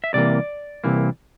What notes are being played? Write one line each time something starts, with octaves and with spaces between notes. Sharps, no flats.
E5
C2 C3 E3 A#3 D5
C2 C3 E3 A#3